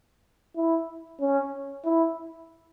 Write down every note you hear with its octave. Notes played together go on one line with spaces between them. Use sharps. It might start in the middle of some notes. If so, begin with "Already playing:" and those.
E4
C#4
E4